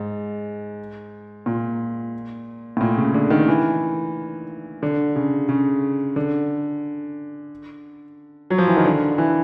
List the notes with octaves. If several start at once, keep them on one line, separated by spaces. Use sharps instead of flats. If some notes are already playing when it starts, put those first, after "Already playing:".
Already playing: G#2
A#2
A2
A#2
C#3
D3
D#3
E3
D3
C#3
C#3
D3
F#3
F3
E3
D#3
D3
E3